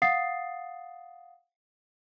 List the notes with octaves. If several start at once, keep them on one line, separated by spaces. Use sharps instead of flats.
F5 F#5 D#6 A6 C7